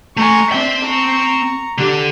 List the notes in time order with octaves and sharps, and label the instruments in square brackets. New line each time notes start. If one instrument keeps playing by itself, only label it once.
[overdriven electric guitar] A3 G#5 [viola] A#5 C#6
[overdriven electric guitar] C4 G5 [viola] D4 E5
[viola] A#5 C#6
[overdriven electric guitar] D3 D4 [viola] G4